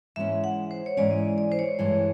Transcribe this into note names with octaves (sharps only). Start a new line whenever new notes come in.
G#2 E3 G#3 C#4 E5
F#5
C5
C#5
G#2 E3 G#3 C#4 D5
D#5
D5
D5
C5
C#5
G2 E3 G#3